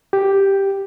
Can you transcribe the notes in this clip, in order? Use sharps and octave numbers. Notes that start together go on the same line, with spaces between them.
G4